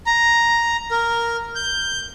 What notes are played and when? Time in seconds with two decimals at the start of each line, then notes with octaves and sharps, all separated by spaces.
0.06 A#5
0.91 A#4
1.55 G6